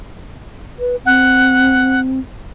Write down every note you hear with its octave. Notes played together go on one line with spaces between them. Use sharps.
B4
C4 F#5